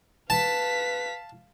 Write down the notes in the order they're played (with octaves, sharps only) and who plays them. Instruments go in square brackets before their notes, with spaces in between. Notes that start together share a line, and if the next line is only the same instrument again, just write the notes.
[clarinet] B4 [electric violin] F5 B6 [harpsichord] A5